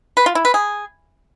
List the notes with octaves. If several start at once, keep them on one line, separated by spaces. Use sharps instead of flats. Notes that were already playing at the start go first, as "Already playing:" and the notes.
B4
F4
E4
B4
G#4